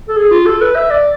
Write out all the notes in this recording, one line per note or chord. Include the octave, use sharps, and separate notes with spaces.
A4
G#4
F4
A4
B4
E5
D5